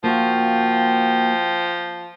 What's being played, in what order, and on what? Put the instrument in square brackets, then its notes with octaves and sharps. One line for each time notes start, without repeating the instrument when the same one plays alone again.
[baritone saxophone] F3 [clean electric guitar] A#3 F#4 [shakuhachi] G5